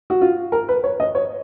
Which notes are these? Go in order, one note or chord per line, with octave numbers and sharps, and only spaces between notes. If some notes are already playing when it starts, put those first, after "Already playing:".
F#4
F4
A#4
B4
C#5
D#5
C#5